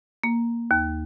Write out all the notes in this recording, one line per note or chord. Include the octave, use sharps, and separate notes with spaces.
A#3
D#2